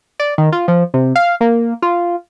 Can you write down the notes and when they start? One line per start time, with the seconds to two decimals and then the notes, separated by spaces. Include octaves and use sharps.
0.20 D5
0.38 D#3
0.52 F4
0.68 F3
0.94 C3
1.16 F5
1.41 A#3
1.82 F4